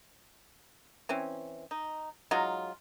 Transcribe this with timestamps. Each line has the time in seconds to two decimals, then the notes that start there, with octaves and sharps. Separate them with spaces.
1.09 E3 C4 C#4
1.71 D#4
2.31 F#3 G#3 D#4 F4